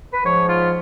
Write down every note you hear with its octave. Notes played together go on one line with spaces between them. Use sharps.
B4
G#2 F3 C#5
F4